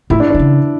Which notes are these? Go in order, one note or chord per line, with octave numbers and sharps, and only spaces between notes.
A2 E4
D4
D3 D4
C#3